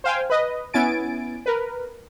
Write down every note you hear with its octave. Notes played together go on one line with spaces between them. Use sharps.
C5 F5 G5 G#5
B4 D#5
B3 C#4 E4 G#5 A6 D7
A#4 B4